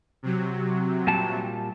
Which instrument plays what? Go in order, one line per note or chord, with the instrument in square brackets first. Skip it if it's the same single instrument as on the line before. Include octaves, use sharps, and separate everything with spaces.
[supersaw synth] C3 F#3
[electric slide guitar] A#2 G3 A5